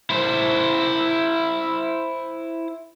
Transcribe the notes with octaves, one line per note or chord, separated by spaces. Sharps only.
E4 C5